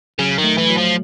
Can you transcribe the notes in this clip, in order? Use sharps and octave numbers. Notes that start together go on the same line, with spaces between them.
C#3 F#3
D#3
A3
E3
F#3
F3